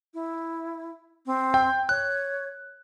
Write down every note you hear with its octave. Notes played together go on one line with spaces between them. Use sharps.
E4
C4
G5
C#5 F#6